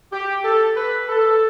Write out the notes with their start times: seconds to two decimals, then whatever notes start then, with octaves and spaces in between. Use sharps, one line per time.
0.13 G4
0.44 A4
0.77 B4
1.09 A4